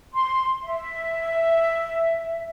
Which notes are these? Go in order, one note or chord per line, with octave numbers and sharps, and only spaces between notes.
C6
E5